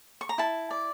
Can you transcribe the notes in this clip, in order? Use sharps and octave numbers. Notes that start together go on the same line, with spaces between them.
C#6
A#5
E4 A5
D5